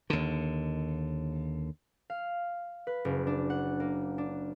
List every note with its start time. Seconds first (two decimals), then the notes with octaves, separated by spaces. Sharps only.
0.10 D#2 D3
2.10 F5
2.87 B4
3.05 F#1
3.27 D4
3.50 F#5
3.80 A#3
4.18 D4